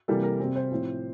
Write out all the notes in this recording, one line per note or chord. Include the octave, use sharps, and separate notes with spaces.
C3 E3 G3 A#3 A4
A#4
C3 G3 C4
C5
A2 F3 C4